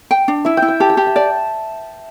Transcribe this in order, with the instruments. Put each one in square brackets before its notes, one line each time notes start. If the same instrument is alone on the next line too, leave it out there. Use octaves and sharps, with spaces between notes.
[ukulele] G5
D4
[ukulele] E4 [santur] E5
[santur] G5
[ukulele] E4
[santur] G5
[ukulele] G4 [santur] A5
[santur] G5
[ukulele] G4
[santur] E5
[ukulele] D5 [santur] A5